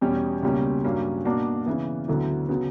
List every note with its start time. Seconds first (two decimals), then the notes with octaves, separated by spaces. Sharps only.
0.01 E2 B2 G3 C#4
0.43 C#2 B2 G3 A#3 C#4
0.84 G2 F#3 A#3 C#4
1.25 B2 A#3 D4 F#4
1.66 C#3 E3 B3
2.08 D2 D3 F#3 B3 E4
2.49 C#3 F#3 B3 F#4